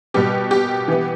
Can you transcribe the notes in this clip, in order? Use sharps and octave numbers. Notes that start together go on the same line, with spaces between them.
B2 G3 B3 G4
G4
E3 B3